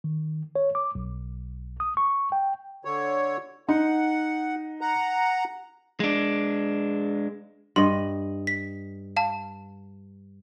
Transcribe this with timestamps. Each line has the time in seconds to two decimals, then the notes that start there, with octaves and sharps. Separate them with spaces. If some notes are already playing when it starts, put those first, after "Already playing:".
0.04 D#3
0.56 C#5
0.75 D6
0.95 B1
1.80 D#6
1.97 C#6
2.32 G5
2.85 D3 C#5
3.69 D#4 F#5
4.81 F#5 A#5
6.00 G#3 D4
7.76 G2 D#5 C6
8.47 B6
9.16 F5 A5